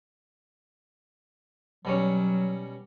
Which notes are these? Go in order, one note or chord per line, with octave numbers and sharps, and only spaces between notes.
B2 F#3 G3 C#4